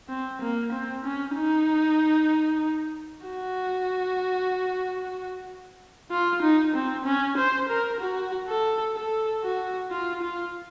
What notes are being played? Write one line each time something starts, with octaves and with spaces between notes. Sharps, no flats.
C4
A#3
C4
C#4
D#4
F#4
F4
D#4
C4
C#4
C5
A#4
F#4
A4
A4
F#4
F4
F4